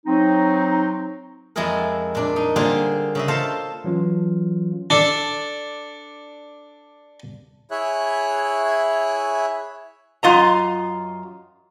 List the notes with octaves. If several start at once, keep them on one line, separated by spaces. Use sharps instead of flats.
F#3 C4 D#4
F2 G#3 E4 F4 G#4 A#4
A#2 D4
D#4
D3 G3 A#3 C4 F4 G#4
C#3 D#5 E5
F4 A4 C5 F5 A5 A#5
E3 F#3 C#4 F4
D4 A4
E4 G#4 C#5 E5 F#6
F#2 F4 D#5 A#5